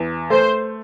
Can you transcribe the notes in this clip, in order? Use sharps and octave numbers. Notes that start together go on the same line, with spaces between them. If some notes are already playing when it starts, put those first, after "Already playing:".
Already playing: E2
A3 C5